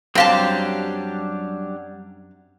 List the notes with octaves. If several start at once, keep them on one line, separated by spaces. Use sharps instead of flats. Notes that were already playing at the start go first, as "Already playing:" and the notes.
F#2 F#3 G3 C4 D4 G4 F5 A5